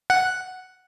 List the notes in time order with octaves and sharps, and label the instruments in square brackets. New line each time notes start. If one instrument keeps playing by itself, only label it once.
[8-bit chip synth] F#5